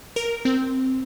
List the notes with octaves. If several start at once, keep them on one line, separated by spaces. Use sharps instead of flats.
A#4
C4